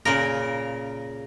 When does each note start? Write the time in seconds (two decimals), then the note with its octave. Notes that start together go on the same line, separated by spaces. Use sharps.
0.05 A#2 C#3 A#4